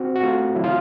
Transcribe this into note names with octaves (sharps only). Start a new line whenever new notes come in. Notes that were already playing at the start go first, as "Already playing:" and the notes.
Already playing: C4 F#4
F#4
A3 F4
F#3 E4
F4